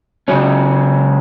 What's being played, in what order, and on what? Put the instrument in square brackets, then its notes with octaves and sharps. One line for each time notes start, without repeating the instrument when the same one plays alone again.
[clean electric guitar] C#2 C#3 F#3 C#4